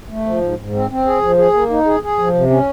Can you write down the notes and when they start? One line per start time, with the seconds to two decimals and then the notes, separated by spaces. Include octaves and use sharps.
0.10 A3
0.26 F3
0.42 G#2
0.58 G#2
0.75 C4
0.90 C4
1.06 G#4
1.22 F3
1.38 G#4
1.54 A#3
1.70 D#4
1.86 G#4
2.03 G#4
2.19 F3
2.35 C3
2.50 C#4